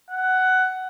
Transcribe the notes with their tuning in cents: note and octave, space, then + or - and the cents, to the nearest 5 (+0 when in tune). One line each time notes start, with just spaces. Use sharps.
F#5 +10